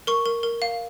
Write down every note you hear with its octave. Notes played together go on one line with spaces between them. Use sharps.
A#4 C#6
A#4
A#4
F5